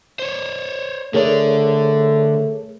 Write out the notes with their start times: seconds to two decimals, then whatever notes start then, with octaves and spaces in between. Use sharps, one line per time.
0.19 C5 C#5
1.14 D3 A3 G#4 A#4 C#5 D5